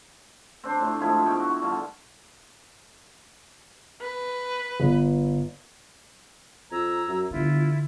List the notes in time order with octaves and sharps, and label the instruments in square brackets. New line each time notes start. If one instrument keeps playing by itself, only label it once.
[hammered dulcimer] C4 D4 C5
A2 C3
F3 G#3 E4
B2 G5 C#6
F#4
D3 G3 F4
[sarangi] B4
[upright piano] G1
[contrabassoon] F2 [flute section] A#5 E6 G#6
[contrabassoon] F#2
[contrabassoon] G1 [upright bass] D3 E3 [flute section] E4 F4